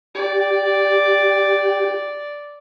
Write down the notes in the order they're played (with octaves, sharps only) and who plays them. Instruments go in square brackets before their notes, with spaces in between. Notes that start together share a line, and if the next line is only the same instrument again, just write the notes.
[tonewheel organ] G4 [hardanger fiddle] D5